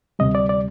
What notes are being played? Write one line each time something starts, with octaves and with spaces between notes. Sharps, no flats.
D2 C3 G3 D#5
D5
D5